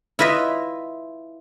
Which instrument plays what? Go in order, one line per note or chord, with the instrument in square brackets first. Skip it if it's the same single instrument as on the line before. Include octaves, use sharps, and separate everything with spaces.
[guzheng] E4 F4 B4 D#5 E5